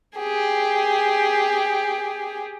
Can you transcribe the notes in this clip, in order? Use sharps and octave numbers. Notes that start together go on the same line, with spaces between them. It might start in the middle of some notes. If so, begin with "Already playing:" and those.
G4 G#4